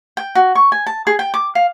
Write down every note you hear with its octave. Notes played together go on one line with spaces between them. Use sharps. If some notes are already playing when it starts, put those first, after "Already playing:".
G5
F#4
C#6
G#5
A5
G#4
G5
D6
F5